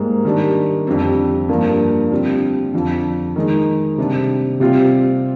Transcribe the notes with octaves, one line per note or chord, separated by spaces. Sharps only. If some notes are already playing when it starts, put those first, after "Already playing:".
Already playing: G#2 G3 A#3
D#3 G3 D4
F2 D3 G3 C4
G2 F3 A#3
D3 G3 C4 F4
F2 D3 F3
D#3 G#3 D#4
C3 G3 D4
C3 G3 C4 F4